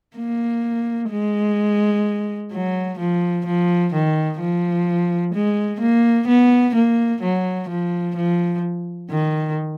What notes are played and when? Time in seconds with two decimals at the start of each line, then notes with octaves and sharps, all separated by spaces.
0.17 A#3
1.10 G#3
2.52 F#3
2.99 F3
3.46 F3
3.93 D#3
4.40 F3
5.34 G#3
5.81 A#3
6.28 B3
6.75 A#3
7.22 F#3
7.69 F3
8.16 F3
9.10 D#3